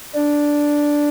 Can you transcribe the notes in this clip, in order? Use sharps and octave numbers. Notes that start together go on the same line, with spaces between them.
D4